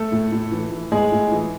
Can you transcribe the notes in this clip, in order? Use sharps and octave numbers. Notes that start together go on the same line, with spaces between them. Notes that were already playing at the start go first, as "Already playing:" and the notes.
Already playing: A3 A4
A2
A2
E3
E3
A2 G#3 G#4
A2
E3